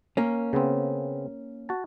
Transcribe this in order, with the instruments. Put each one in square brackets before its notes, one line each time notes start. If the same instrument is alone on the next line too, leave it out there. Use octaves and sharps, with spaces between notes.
[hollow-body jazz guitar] A#3 C#4
[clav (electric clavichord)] C#3 B3 C4
F#4 A5